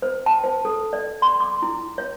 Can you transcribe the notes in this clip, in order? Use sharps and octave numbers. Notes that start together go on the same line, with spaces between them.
C5
A5
C5
A4
D5
C6
D6
E4
C#5